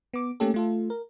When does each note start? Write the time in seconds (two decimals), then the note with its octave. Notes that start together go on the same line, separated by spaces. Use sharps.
0.13 B3 D6
0.40 A3 A#3 C#4 G4 A4
0.54 A3 F4 A4
0.90 A#4